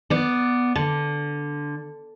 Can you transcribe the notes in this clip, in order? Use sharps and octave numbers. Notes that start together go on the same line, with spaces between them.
B3 D5
D3